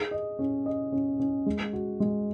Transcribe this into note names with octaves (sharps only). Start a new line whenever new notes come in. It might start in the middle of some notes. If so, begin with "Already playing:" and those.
Already playing: G#4
D#5
C#4
D#5
C#4
C#4
G#3
F#4
G#3